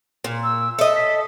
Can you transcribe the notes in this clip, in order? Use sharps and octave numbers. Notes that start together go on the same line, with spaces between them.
A#2
E6
A4 D#5 E5
B6